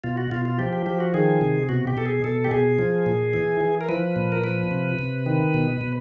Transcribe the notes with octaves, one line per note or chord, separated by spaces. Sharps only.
B2 F4
F#4
B2 F4
F4
F3 G4
G4
F3 G4
F#4
D#3 G#4
C3
B2 F#4
G4
B2 A4
G#4
B2 A4
G4
B2 G#4
F3
A#2
E3
E3
A#4
F3 B4
A#2
A#4
F3 B4
C3
C3
D#3
B2
B2